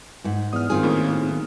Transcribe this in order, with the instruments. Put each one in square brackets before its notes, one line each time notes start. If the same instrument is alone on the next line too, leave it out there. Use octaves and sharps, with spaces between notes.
[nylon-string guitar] G#2 F#5
[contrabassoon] E2 [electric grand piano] D#6 F6
[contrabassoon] G#1 [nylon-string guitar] D#3 F4 G#4
[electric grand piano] A2 A#3 C#4
[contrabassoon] G#1 [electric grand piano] A2
[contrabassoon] B1